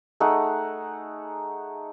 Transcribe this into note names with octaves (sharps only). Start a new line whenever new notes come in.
A3 D#4 G#4 F#5